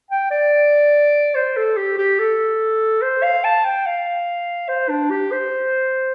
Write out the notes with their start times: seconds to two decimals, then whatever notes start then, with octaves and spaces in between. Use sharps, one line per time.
0.11 G5
0.31 D5
1.35 C5
1.57 A4
1.77 G4
1.98 G4
2.19 A4
3.02 C5
3.23 F5
3.44 A5
3.64 G5
3.86 F5
4.68 C5
4.89 D4
5.11 G4
5.32 C5